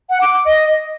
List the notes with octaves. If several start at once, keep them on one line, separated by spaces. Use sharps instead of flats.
F#5
D6
D6
D#5